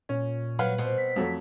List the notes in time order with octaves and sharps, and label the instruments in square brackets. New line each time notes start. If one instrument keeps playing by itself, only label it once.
[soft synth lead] A#2 [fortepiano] C#4
[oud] F#3 [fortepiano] B4 F5
[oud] B2 C4
[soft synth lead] B6
[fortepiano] F2 F#3 A3